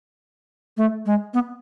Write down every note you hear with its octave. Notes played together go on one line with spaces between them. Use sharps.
A3
G#3
B3